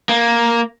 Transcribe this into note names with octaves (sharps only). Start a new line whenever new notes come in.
A#3